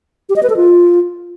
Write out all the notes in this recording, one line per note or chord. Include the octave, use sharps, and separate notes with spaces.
G4
D#5
B4
A4
F4